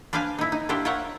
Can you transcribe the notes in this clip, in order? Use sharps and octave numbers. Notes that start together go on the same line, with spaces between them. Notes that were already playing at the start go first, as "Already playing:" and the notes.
D4 B4 C5 F5 G#5
D#4 E4
D#4
D4 E4 F4 G4 C5
F4 A#4 C5 C#5 E5 F#5